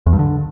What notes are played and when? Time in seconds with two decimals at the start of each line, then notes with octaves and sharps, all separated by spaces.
0.06 E2
0.13 G2
0.19 D3